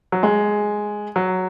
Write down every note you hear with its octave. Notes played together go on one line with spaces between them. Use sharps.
F#3
G#3
F#3